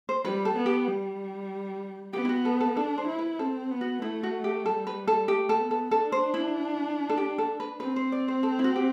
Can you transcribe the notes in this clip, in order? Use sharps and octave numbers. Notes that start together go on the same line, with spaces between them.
C5
G3 B4
A4
B3
G4
G3
B3 G4
E4
F#4
A4
A4
D4 A4
C5
E4
B4
C4 A4
B3
F#4
A3 E4
F#4
G4
G3 A4
B4
A4
A3 G4
A4
B3
A4
D4 A4
C5
E4
A4
G4
A4
B4
C4 B4
C5
D5
C5
A4
E4
F#4
G4